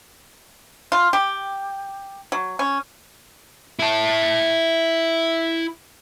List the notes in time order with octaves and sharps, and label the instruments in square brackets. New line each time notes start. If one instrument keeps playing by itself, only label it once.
[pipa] F4
G4
F#3
C#4
[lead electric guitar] E4 A5